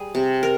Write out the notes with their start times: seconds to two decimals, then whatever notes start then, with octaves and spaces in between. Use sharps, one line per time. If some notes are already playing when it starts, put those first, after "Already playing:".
Already playing: G3 G#4
0.15 C3
0.43 A#4